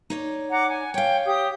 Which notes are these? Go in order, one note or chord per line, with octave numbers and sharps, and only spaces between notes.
D#4 C#5 D5
F#5 A#5 D6
G#5
C#5 F5 G5
G4 D#6